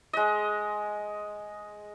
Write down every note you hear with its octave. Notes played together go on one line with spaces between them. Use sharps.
G#3 D#5